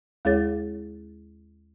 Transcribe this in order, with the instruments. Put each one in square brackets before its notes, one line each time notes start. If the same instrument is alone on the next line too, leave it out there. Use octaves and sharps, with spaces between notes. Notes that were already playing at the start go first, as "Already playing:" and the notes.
[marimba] D#2 G#3 E4 G#4 C#5 A6